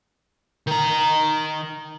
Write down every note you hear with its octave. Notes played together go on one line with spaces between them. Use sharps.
D#3 A#5